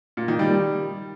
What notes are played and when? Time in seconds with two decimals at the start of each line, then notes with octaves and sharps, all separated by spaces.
0.17 A#2
0.28 D#3
0.39 G3